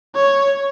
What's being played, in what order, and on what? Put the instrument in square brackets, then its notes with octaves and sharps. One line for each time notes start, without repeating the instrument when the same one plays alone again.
[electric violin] C#5